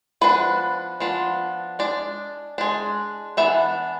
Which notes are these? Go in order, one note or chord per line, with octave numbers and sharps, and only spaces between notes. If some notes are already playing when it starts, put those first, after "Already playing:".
F3 B3 D4 B4
F3 B3 D4
G#3 D4 D5
G#3 D4
E3 B3 D4 E5